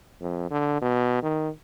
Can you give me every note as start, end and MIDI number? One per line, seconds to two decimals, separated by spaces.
0.21 0.48 41
0.51 0.78 50
0.82 1.21 47
1.23 1.49 51